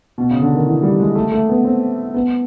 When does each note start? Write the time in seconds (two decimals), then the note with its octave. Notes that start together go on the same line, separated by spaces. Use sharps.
0.18 B2
0.31 C#3
0.42 D3
0.55 D#3
0.66 E3
0.83 G3
1.00 G#3
1.15 A3
1.32 A3
1.49 B3
1.65 C4
2.14 B3